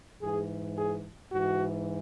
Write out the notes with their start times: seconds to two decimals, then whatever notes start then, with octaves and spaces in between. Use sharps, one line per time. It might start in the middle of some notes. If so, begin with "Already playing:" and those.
0.21 G#2 E3 G#4
0.77 G#4
1.31 G#2 E3 F#4